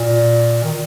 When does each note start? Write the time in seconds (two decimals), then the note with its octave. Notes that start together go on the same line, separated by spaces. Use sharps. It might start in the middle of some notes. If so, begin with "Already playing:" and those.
Already playing: A#2
0.64 D#3